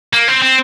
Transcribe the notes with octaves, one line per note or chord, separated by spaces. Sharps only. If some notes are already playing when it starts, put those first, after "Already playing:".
A#3
C4
C4